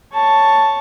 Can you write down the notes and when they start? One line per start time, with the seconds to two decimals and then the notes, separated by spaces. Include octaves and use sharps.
0.13 C#5 A5